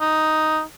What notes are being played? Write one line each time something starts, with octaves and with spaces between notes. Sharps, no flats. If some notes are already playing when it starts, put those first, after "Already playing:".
D#4